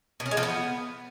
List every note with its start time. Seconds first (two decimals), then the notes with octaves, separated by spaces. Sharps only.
0.20 B2
0.26 C#4
0.31 G#3
0.37 F3
0.43 B3